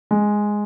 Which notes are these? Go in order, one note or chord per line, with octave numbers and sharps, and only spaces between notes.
G#3